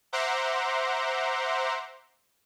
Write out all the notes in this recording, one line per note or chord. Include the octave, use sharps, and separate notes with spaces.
C5 E5 F#5 A#5 C6 D6